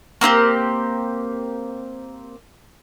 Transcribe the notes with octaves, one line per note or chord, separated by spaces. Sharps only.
A#3 C4 E4 G4